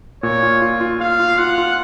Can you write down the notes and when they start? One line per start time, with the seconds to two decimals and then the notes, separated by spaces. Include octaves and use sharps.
0.23 A#2 C#5
0.42 F4
0.62 F4
0.81 F4
1.00 F4 F5
1.20 F4
1.38 F4 F#5
1.58 F4